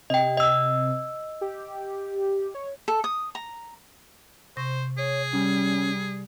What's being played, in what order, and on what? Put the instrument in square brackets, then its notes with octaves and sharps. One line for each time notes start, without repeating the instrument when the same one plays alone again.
[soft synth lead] C3 [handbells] D#5 G5
[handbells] D#5 E6
[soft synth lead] G4
C#5
[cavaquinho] A4
D#6
A#5
[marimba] C3 C#6 A#6 [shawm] C5
[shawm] G#4 [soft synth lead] C#5
[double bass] G3 [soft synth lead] C#4